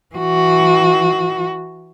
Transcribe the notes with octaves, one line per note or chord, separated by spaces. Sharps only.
E3 F#4